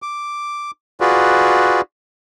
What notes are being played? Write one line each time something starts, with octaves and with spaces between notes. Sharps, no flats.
D6
F4 F#4 G#4 B4 D5